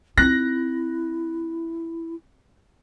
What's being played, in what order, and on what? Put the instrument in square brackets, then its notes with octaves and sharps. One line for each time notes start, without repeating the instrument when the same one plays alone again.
[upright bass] C4 D#4 [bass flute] E4 [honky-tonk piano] F#6 A#6